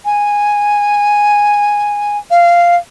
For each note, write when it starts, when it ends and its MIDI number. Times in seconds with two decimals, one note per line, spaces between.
0.05 2.18 80
2.30 2.76 77